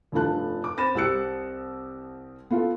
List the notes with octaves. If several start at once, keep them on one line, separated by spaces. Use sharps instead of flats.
F1 G2 A3 F4 A5 F#6
D6
C4 B5 A6 A#6 E7
C2 C4 G4 E6 F#6 C#7
B3 F4 A4